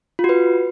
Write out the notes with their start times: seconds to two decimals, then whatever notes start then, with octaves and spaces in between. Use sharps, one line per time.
0.19 F4
0.24 F#4
0.29 B4